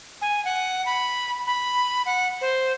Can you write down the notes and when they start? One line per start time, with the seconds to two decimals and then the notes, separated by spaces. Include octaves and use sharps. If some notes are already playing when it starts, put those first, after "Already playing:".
0.22 G#5
0.45 F#5
0.86 B5
1.47 B5
2.06 F#5
2.41 C5